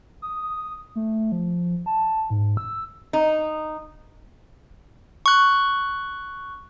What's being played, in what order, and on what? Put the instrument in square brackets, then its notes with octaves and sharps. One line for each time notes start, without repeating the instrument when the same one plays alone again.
[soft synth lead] D#6
A3
F3
A5
G#2
E6
[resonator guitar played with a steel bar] D#4
[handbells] C#6 F#6